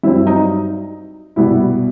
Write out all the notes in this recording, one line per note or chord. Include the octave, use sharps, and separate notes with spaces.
G2 F#3 C4 E4
D#4
C2 B2 G3 B3 E4